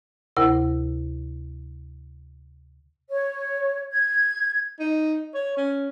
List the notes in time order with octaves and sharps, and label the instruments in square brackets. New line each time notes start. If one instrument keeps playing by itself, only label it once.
[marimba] D2 C3 E4 A#4
[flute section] C#5
G#6
[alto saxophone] D#4
C#5
C#4